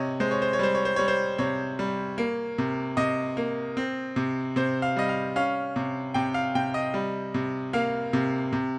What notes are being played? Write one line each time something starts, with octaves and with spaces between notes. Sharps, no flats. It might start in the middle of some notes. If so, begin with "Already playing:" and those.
Already playing: C3 C#5 D#5
G#3 C5
C#5
C5
C#5
G3 C5
C#5
C5
G3 C#5
C5
C3 C#5
G3
A#3
C3
C3 D#5
A#3
C4
C3
C3 C5
F5
G3 D#5
F5
C#4 F5
C3
C3 G5
F5
C3 G5
D#5
G3
C3
A#3 F5
C3
C3